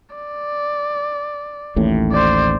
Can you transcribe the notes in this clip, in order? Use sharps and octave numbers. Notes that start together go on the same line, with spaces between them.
D5
A1 D#2 A2
C5 D5